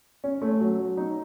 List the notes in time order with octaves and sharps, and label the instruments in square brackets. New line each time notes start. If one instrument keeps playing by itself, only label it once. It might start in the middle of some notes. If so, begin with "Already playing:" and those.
[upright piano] C#4
A3
F#3
F#3
D#4